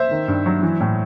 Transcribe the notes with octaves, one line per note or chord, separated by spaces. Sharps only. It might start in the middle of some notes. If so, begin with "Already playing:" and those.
Already playing: C5 E5
D#3
G2
F#3
E3
A2